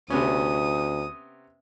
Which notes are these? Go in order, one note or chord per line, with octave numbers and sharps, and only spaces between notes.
D2 C3 B3 C#4 D#6